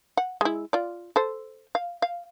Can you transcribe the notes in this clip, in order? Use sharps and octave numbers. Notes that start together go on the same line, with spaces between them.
F#5
G#3 E4
F4 D5
A4 C5
F5
F5